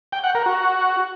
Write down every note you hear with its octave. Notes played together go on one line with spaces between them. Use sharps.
G5
F#5
A#4
F#4